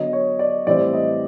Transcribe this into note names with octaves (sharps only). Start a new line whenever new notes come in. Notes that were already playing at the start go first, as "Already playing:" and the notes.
Already playing: D3 F#3 B3 D#5
C#5
D5
A2 E3 G3 C4 D5
D#5